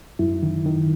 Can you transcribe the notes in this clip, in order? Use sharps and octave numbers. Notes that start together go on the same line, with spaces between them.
F#2 E4
D#3
D#3